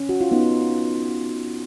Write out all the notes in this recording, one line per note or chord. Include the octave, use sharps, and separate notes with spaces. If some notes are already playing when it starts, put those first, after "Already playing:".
Already playing: C#4
F#4
F4
B3 D#4